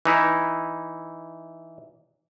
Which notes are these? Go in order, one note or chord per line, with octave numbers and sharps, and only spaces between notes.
E3 D#4 E4